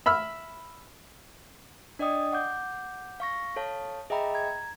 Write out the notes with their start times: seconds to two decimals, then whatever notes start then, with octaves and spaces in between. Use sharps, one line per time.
0.06 E5 B5 E6 F6
1.99 D4 D5 D#5 G5 D#6
2.32 F#5 D6 G6
3.20 F5 C#6 A#6
3.56 A4 C#5 F5 A5
4.10 G#4 D#5 E5 G5 A#5 B5
4.34 A#5 G#6